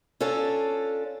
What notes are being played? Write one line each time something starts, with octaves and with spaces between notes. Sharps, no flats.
C#4 D4 F4 A4